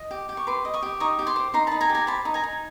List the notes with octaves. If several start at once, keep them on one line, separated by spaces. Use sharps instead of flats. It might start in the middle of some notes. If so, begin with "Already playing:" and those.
Already playing: D#5
G4
G4
C#6
B4 C6 D6
D#5
C#6 D#6
G4
D#4 C#6 D#6
G4
C6 D6
C5
D#4 A#5 C6
D#4 A5 B5
G#5 A#5
G4
G#5 A#5
C5 A5 B5
D#4
G#5 A#5
D#4